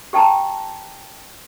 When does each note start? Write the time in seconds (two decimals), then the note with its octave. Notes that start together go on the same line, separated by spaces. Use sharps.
0.13 G4 G5 A5 A#5